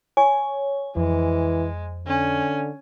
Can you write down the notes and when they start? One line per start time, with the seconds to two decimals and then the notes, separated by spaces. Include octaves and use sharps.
0.17 C#5 G#5
0.96 F2 E3 G#3
2.07 D3 C#4